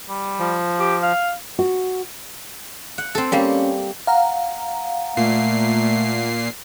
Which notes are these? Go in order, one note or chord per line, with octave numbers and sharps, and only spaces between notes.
G3
F3
G4
F5
F#4
F#5
C4 A4
G3 A#3 C4 C#4
F5 F#5 A#5
A#2 A3 C7